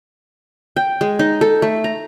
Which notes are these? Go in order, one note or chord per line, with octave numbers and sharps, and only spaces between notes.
G5
G#3
D#4
A4
A3
A#5